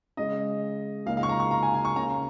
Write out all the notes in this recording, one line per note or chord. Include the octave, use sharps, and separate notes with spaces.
C#3 G#3 C#4 D#5
C#2 C#3 A#3 D#4 F5
F5
C#6
A#5
C#6
A#5
G#5
G#5
C#6
C#3 A#3 C#4 A#5